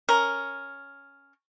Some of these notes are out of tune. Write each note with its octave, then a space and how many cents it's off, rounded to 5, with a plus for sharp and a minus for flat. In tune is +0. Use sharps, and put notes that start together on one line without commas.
C#4 +0 A#4 +0